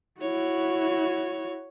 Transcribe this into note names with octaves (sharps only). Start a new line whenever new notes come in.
E4 F#4 C#5